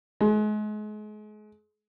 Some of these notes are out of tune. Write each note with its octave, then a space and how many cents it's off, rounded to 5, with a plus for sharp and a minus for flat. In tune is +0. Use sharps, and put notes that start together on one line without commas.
G#3 +35